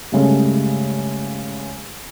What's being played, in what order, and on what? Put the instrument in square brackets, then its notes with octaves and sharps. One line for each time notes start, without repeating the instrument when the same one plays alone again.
[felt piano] G2 C#3 G#3 A3